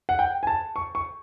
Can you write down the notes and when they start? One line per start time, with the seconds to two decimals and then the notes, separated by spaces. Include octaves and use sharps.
0.09 F#5
0.19 G5
0.43 G#5
0.47 A5
0.76 C#6
0.95 C#6